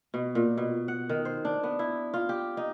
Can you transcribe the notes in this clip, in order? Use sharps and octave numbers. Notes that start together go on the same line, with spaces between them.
B2
A#2
B2
F#5
D#3
C5
D4
B3
E4
F4
G4
D#4